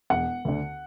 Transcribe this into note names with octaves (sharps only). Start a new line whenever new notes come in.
E1 F#5
D2 D3